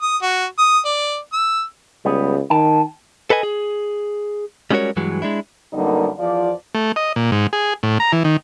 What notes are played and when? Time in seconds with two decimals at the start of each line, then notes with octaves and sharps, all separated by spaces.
0.02 D#6
0.22 F#4
0.58 D#6
0.85 D5
1.33 E6
2.05 C#2 G3 B3 G#4
2.50 D#3 G5 A5
3.30 A4 B4 D#5 G#5
3.43 G#4
4.71 G3 G#3 C#4 F#4 A#4 C#5
4.96 G2 E3 F#3 G#3
5.22 G#3 D4 E4
5.73 F#2 D3 G3 A#3 B3 D#4
6.19 E2 F3 F4 D5
6.75 A3
6.96 D#5
7.16 A#2
7.32 G#2
7.53 G#4
7.83 A2
8.00 A#5
8.12 E3
8.24 D#3